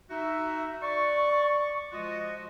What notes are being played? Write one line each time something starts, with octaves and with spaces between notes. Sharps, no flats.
D#4 F#4 E5
D5 C#6
F3 G#3 F4 F#4 D#5